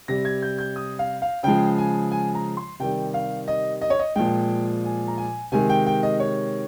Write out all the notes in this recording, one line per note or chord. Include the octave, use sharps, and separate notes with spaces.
C3 G3 A#6
G#6
G6
G6
D#6
F5
F5
C#3 F3 G#3 G5
G#5
G#5
A#5
C6
C3 D#3 G3 G5
F5
D#5
D#5
C#5
D#5
A#2 F3 G#3 G5
G#5
A#5
G#5
C3 D#3 G#3 G#5
G5
G5
D#5
C#5